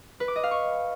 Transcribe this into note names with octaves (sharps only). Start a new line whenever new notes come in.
B4
D6
D#5
F5
C#6